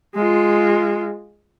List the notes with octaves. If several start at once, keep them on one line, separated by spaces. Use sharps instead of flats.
G#3 F4